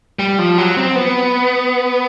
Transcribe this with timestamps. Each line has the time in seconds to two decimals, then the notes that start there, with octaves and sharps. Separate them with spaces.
0.19 G3
0.39 F3
0.58 F#3
0.77 C4
0.95 B3